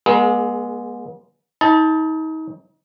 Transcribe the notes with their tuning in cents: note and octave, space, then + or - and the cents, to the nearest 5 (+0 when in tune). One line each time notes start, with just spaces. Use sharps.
G#3 +0 B3 -45 G#4 +30
D#4 +35 A5 +0